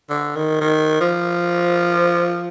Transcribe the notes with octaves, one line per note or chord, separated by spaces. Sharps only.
D3
D#3
D#3
F3